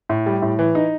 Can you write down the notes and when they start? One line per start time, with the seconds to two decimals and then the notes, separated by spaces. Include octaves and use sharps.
0.09 A2
0.26 G3
0.42 A2
0.59 E3
0.75 D#4